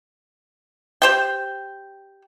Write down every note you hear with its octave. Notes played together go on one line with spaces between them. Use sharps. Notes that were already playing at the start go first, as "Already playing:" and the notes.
G4 C5 G5